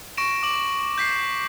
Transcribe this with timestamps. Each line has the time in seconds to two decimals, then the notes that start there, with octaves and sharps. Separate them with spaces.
0.17 C#6 A#6 D7 E7
0.43 D6 F#7
0.98 G6 B6 C7